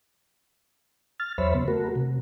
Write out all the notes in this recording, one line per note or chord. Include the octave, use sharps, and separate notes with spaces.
F6 A6
E2 F#3 C5 C#5 E5 B5
C#3 B3
A3 F#4 A#4
C3